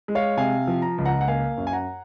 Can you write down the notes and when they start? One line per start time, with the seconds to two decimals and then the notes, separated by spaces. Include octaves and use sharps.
0.08 G#3
0.15 C#5 F5
0.37 C3 F5 G#5
0.67 F3
0.82 A#5
0.98 C#2
1.05 F#5 A#5
1.21 F#5
1.28 A#3 F5 G#5
1.58 F#2
1.67 G#5
1.73 F#5 A#5